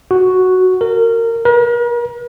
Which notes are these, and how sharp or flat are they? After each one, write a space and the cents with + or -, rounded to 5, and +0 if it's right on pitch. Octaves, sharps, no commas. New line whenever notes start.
F#4 +0
A#4 -20
A#4 +45